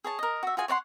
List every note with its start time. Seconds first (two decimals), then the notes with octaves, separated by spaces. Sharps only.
0.04 G#4 C#5 A5
0.19 A#4 D#5
0.43 F#4 E5
0.57 F4 F#4 G#4 G#5
0.68 C#5 D5 F#5 C6